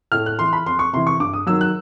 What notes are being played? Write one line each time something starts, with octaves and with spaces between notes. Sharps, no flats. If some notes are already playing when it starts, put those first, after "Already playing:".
A2 F6
F#6
E3 C6
B5
F2 C6
C#6
C3 E3 C6
C#6
G2 D6
D#6
D#3 F#3 E6
F#6